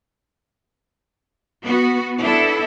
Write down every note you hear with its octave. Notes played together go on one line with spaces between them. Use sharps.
B3 F#4
B3 D4 E4 A4